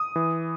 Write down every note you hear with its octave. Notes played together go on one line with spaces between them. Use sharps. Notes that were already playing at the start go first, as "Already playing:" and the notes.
Already playing: D#6
E3